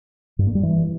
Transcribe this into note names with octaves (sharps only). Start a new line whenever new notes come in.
G2
A#3
G3
E3